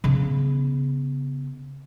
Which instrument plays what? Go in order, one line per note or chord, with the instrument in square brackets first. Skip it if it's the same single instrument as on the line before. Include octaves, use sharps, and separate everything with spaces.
[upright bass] C#3 B3